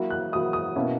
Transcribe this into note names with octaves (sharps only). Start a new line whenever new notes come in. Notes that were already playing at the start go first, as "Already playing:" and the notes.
Already playing: F#3 A#3 E4
F#6
F#3 A#3 E4 D#6
D#6
B2 A#3 C#4 E4